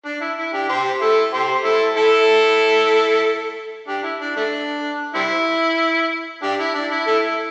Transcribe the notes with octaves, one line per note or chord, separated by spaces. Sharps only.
D4
E4
E4
D4 G4
G4 C5
E4 A4
G4 C5
E4 A4
E4 A4
D4 G4
E4
D4
A3 D4
G3 C4 E4
D4 G4
E4
D4
E4
E4 A4
E4